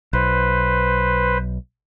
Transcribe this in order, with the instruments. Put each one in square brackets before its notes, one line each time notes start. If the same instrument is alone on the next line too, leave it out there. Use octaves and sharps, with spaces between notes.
[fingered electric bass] B1 [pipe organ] B4 C5